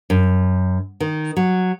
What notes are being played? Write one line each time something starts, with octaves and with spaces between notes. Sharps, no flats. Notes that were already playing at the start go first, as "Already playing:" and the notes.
F#2
D#3
F#3